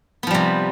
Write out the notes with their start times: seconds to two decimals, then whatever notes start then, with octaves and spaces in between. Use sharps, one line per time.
0.23 B3
0.27 F3
0.31 G3
0.34 C3